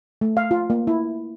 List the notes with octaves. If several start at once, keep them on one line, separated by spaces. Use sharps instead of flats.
A3
F5
F4
A#3
E4